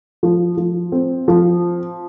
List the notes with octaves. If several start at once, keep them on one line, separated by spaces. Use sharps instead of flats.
F3
F3
C4
F3